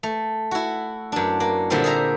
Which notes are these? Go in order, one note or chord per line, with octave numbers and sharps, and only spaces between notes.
A3
E4 F#4
F#2 D4
A#3
A#2 D3 G3 A#3 C4 E4
G#4 C5 E5 A#5